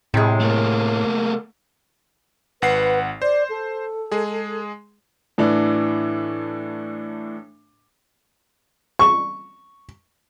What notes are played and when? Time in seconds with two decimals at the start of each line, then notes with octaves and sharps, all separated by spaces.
0.14 A2 C3 G#3
0.40 A3 A#3
2.62 G#1 B4 F#5 C7
3.22 C5 D5
3.50 A4
4.12 G#3 G#4
5.38 A2 E3 D4
8.99 C#6